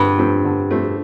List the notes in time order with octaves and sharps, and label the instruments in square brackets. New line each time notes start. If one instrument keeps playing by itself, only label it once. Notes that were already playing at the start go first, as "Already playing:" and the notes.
Already playing: [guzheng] G2 [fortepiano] D3 F3 A3 C4
[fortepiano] F3 A3 C4
D3
F3 A3 C4